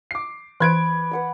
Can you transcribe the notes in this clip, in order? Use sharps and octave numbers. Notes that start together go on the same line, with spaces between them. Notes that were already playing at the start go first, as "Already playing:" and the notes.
D6 C7
E3 B4 B5 F#6 G#6 D7
B4 F#5 B5